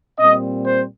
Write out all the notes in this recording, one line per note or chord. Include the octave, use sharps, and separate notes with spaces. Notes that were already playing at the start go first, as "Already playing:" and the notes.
A#2 G3 C4 D#5
C5